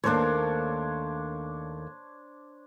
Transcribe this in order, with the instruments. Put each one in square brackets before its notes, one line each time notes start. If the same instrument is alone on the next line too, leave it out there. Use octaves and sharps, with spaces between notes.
[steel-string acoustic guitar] D#2 A3 A#3 [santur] D4 C5 C#5